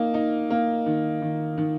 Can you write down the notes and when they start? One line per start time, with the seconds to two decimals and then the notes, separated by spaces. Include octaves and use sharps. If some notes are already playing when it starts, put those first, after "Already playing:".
Already playing: A#3 D#4
0.14 D#4
0.50 A#3
0.86 D#3
1.22 D#3
1.58 D#3